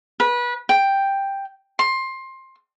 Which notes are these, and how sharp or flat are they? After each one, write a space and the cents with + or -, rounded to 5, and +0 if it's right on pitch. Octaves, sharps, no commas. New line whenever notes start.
B4 -25
G5 +5
C6 +20